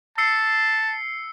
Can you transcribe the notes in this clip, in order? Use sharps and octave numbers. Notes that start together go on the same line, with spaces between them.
A5 E6 C7 C#7